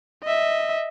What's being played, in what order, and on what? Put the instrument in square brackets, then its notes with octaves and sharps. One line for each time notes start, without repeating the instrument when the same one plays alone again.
[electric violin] D#5 E5